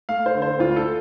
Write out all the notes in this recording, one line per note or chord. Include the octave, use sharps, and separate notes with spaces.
A3 F5
C5
D3
C5
D2 F4
A4